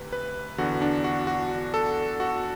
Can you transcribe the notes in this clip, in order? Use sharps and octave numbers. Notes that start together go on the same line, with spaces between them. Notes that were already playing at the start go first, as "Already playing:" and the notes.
Already playing: D2 C3 B4
B4
E2 D3 F#4
D4
F#4
F#4
A4
F#4